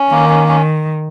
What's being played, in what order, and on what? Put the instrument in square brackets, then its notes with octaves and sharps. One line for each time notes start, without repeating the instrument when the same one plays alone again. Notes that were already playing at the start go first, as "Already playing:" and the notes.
Already playing: [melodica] C#4
[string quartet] D#3 [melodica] A#3
[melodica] C#4
C#4